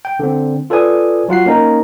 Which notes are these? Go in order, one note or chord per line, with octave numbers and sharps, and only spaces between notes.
G5
D3 C4
F4 A4 B4 D5 G#5 D#6
F#3 F4 F#5 C7
A#3 C#4 D#4 A#4